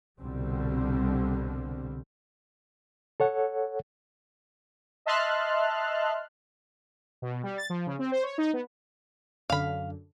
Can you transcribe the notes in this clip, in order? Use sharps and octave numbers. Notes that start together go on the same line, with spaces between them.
C2 B2 D3 G3 C4
A4 C#5 F#5
D#5 E5 A5 C6 F6 F#6
B2
G3
A6
F3
C#3
C4
C5
C#5
D#4
B3
F#2 D3 F5 B5